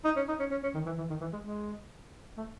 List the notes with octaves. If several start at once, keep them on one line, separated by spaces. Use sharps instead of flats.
D#4
C#4
D#4
C#4
C#4
C#4
D#3
E3
E3
D#3
E3
G#3
G#3
A3